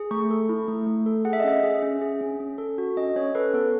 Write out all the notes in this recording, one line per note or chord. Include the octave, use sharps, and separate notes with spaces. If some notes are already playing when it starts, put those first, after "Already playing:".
Already playing: G#4
A3 C#6
A4
E4
A3
A3
A4
G#4 F#5
E5
D#5
C#4 E5
G#4
C#4
G#4
C#4
C#4
A4
F#4
C#4 D#5
C#4 C#5
A4 B4
B3 A4